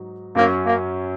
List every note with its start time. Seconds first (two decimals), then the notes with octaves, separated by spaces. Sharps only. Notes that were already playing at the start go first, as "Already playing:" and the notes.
Already playing: G#2 F#3 D#4
0.35 F#2 F#3 A#3 C#4
0.65 A#3